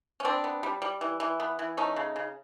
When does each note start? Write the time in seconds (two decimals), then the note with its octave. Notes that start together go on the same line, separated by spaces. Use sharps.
0.20 C#4
0.24 B3 C4 D4
0.44 B3
0.63 G3
0.82 G3
1.01 E3
1.20 E3
1.40 B3
1.59 E3
1.77 A3 C#4 D#4
1.96 C#3
2.16 C#3